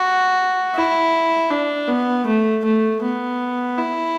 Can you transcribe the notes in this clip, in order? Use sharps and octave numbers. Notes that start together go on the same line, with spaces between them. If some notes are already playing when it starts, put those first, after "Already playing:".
Already playing: F#4
E4
D4
B3
A3
A3
B3
E4